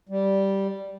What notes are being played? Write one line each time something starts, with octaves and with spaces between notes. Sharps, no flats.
G3